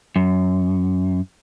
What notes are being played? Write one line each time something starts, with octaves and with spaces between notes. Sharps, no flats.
F#2